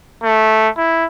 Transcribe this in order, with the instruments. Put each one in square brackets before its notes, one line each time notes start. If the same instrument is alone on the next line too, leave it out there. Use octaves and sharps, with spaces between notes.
[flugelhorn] A3
E4